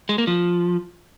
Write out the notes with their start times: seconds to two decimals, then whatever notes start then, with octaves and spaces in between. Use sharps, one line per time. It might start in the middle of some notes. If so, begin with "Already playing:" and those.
0.09 G#3
0.18 A#3
0.27 F3